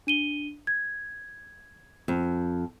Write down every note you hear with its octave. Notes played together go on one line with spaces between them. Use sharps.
D4 D#7 G7
G#6
F2